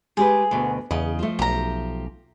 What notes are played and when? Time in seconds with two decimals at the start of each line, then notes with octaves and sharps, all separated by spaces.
0.17 G#3 G4 G#4 B4
0.51 D2 B2
0.91 E2 C#3 D#5
1.19 F3 A3
1.39 B1 G4 A#5